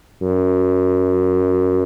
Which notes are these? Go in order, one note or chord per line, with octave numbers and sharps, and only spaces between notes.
F#2